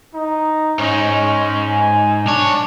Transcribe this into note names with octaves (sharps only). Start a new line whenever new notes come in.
D#4
G#2 C#4 D#4
G#5
B1 D4 C#5